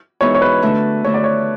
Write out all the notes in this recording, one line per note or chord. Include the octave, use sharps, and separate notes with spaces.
G#2 E3 B3 F#4 C#5
C#5
B4
D3 A3 D4
D3 A3 D4 C#5
D5
C#5